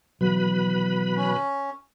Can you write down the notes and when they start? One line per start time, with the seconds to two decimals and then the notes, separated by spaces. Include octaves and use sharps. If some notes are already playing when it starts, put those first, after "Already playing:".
0.21 B2 D#3 E3 F#3 B4 B5
1.17 C#4